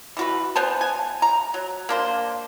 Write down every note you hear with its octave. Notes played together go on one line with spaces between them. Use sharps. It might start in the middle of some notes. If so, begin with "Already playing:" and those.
E3 F#4 B4
B3 C5 G#5 A5
G#5
A#5
F#3
A#3 D4 C5